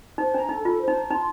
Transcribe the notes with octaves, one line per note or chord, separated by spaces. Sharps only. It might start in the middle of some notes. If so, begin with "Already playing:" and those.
D#4 C5
D4 A#5
D#4 A4
F4 A4
C5
D#4
A#5
D#4 C6